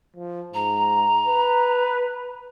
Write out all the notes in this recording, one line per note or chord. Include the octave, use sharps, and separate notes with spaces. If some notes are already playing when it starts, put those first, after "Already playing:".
F3
G#2 A#5
B4